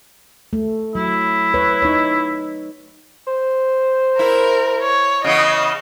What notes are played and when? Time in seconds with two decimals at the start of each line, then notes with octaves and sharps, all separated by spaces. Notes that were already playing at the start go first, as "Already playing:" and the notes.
0.53 A3
0.95 F#3 E4
1.54 B4 C#5
1.82 D#4 C#5
3.27 C5
4.19 E4 A#4
4.82 C#5
5.24 C#3 E3 B3 D#5